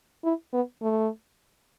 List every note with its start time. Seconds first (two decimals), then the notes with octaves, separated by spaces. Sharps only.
0.24 E4
0.53 B3
0.82 A3